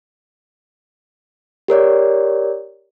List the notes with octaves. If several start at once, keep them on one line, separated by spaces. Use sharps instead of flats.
G4 A#4 C#5 D5